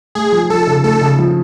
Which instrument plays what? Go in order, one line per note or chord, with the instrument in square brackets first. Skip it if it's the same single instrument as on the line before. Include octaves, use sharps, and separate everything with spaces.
[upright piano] A3 [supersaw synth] G#4
[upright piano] F3
[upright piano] F3 [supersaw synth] A4
[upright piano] C#3
[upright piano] A3 [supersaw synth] A4
[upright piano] C#3
F3